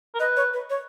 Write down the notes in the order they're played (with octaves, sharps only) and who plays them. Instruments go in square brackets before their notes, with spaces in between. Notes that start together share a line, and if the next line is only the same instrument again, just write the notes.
[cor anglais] A#4
[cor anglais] B4 [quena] D#5
[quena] C#5
B4
C#5